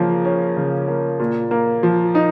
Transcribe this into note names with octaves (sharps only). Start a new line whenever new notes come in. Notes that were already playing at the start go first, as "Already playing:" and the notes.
Already playing: C#3 F3 A#3
C#4
C#3
A#3
A#2
A#3
F3
D#4